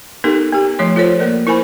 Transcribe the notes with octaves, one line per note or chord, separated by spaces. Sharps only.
B3 D#4 G4 A4 A#4
B3 G4
F3 A3 C#5 C6
F4 A4 C5 C#5
A#3 A#4 D5
E4 A#4 C5 G#5 B5